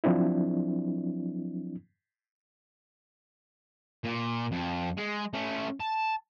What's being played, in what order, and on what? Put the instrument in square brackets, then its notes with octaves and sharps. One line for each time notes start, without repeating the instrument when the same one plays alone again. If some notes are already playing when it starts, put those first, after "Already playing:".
[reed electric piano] F3 F#3 C4 D4 E4
[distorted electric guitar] A#2
F2
G#3
A3 C#4
A5